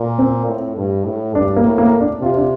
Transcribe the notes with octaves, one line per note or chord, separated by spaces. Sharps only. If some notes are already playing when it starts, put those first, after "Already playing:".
Already playing: A#2
C4
A2
G2
A2
G2 D4
A#3
A2
A#3
D4
C3 F4
D4